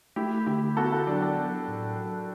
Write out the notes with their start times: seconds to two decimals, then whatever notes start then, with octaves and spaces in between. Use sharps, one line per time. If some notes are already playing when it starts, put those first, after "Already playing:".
0.16 A3 E4 G4
0.47 D3 E4 G4
0.77 B3 F#4 A4
0.92 F#4 A4
1.07 F#3 D4
1.22 D4
1.37 F#3
1.68 A2
1.97 F#3